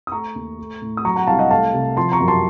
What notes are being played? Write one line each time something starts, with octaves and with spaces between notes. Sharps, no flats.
D#6
A3 A#5 C#6
D#2
A3
A2
D#6
F#3 A#5 C#6
F#5 A#5
C2 F5 A5
D#5 F#5
A3 F5 A5
C3
F3 A5 C6
A#5 C#6
F#2
A5 C6